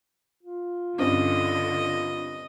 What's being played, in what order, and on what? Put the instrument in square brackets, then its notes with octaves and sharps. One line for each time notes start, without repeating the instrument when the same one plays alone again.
[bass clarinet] F4
[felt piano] G2 C4 C#4 [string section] D3 [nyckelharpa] D#5